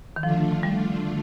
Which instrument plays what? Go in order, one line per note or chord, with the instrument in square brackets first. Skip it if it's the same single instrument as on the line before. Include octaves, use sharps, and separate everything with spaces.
[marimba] D#3
[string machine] D3 A3 D4 F4 [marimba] F3
[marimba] G3